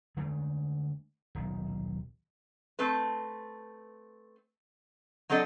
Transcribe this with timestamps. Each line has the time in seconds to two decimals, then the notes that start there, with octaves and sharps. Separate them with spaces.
0.17 D3 G#3 A3
1.35 D#1 B1
2.79 A3 C4 B4
5.30 F#3 C4 D4 A4 D#5